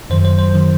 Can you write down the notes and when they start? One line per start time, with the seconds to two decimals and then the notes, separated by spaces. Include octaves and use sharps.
0.10 F#2 D#3 F#3 C5
0.25 C5
0.39 C5
0.55 D#3 F#3